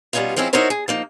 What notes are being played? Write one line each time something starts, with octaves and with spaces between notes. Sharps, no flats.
B2 G3 B3 C#4 D#4 F4
F3 G#3 C4 C#4 E4
D#4 E4 F#4 A#4 C5 C#5
G#4
F3 A#3 D#4